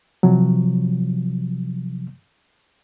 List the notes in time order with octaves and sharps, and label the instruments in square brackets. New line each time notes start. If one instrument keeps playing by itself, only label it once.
[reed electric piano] C3 F3 F#3